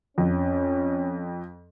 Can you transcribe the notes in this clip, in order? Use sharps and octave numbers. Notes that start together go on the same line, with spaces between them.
F2 C#4